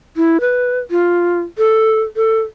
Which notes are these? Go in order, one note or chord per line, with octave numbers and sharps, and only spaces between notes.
E4
B4
F4
A4
A4